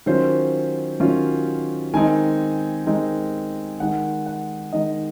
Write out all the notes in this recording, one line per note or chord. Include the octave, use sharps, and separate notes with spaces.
D#3 F#3 C#4 F4 C5
D#3 F#3 C#4 F4
D#3 G#3 C4 D#4 G#5
D#3 G#3 C4 D#4
D#3 G#3 D#4 F#5
F#5
D#3 G#3 D#4 D#5